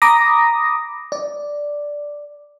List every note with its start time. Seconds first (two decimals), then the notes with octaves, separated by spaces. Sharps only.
0.02 A#5 B5 D6 D#6 A#6
1.12 D5